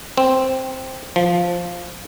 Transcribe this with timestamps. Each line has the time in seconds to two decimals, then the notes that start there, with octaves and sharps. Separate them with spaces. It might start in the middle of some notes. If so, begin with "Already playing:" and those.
0.18 C4
1.16 F3